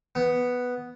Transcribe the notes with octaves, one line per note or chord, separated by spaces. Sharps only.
B3